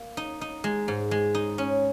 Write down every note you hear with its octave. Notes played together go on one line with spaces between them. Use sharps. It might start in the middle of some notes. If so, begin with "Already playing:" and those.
Already playing: A#3
D#4
D#4
G#3
G#2
G#3
D#4
C#4